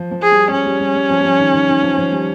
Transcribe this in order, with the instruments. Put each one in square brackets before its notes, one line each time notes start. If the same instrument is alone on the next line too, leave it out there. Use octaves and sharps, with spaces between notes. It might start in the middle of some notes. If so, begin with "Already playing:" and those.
Already playing: [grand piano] F3
F3
[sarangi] G#4
[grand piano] G3
[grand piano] G3 [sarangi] C#4
[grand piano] G3
G3
G3
F3
G3
F3
D#3
D#3
D#3
F3
F3
G3